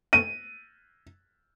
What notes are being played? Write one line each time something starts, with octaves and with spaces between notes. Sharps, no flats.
D#7